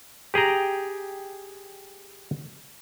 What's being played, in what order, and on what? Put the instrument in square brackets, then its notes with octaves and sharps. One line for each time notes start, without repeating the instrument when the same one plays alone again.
[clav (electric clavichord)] G4 G#4 G5 A#5